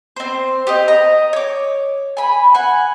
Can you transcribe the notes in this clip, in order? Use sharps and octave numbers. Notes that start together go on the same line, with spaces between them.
C4 C5
G4 C5 D#5
D#5 A#5
C#5 D6
G#5 B5
F#5 G#5